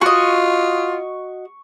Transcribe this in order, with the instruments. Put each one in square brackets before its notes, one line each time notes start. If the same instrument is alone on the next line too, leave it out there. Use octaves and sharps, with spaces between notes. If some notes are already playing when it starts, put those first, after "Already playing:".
[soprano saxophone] F4 [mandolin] F#4 D#5 [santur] C#6